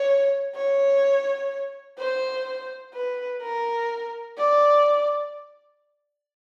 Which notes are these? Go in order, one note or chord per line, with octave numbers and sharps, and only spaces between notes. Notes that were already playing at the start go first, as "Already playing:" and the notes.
Already playing: C#5
C#5
C5
B4
A#4
D5